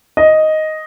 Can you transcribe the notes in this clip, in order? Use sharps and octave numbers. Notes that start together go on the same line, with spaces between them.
D#5